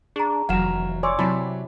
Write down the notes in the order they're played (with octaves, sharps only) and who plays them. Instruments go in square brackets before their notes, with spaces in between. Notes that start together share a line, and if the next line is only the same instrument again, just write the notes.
[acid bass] D4 [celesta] G#4 A#5
[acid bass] F1 [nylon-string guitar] E3 F#3 [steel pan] F5 A#5 [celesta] F#5 E7
[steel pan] C#5 D5 D6 [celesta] G#5 C6 E6
[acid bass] C3 [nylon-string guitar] F#3 C4 [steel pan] E4 A5 B5